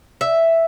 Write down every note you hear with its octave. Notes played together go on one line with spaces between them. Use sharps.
E5